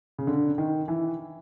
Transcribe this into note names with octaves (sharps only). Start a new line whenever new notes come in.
C#3
D3
D#3
E3